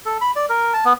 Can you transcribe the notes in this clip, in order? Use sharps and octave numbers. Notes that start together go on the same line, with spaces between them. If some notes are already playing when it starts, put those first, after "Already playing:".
A4
B5
D5
A#4
A5
B3